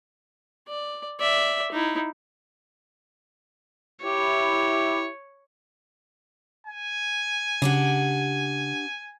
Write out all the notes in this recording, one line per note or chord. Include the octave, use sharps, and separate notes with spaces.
D5
D5 E5
D#4 E4
E4 G4 C#5
G#5
C#3 D4 G4 F#5